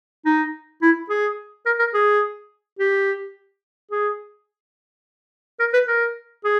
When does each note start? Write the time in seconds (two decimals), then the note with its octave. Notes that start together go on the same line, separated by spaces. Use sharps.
0.26 D#4
0.82 E4
1.10 G#4
1.66 A#4
1.79 A#4
1.94 G#4
2.79 G4
3.91 G#4
5.60 A#4
5.73 B4
5.88 A#4
6.44 G#4